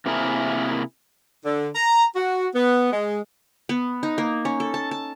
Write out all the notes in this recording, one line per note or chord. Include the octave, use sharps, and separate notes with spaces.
C3 A#3 E4 G#4 A#4
D3
A#5
F#4
B3
G#3
B3
D#4
A#3
C#4
A4
A5
A5